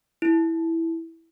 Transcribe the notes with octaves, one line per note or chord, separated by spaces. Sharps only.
E4